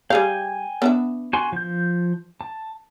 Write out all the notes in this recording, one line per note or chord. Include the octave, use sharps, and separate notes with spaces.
G3 G#4 F5 G5 G#5
B3 D4 E5
F#4 G#5 C6
F3 G6
A5